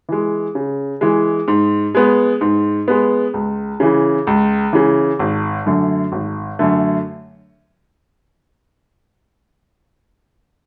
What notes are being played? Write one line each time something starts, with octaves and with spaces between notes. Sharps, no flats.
E3 G#3
C#3
E3 G#3
G#2
G#3 B3
G#2
G#3 B3
C#2
C#3 E3
C#2
C#3 E3
G#1
F#2 D3 A3
G#1
F#2 D3 A3